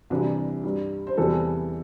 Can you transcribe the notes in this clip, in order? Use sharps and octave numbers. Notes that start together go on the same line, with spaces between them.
C2 C3 E3 G3 D4
G2 G3
C5
E2 C3 E3 G3 A4